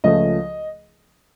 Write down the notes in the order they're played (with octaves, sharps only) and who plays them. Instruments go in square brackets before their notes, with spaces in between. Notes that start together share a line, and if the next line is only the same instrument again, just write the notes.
[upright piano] C#2 C#3 F3 A3 D#5